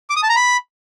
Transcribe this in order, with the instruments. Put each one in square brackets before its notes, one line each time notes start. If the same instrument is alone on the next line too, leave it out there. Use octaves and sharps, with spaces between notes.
[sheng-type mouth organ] D6
D#6
A5
A#5
B5